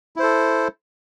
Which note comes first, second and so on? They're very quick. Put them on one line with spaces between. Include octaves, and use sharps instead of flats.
E4 C5 A4